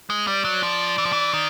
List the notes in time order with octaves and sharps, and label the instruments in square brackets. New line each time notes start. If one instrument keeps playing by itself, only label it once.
[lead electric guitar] G#3
[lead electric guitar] G3 [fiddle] D5
[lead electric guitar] F#3
F3
E3
F3
E3
D#3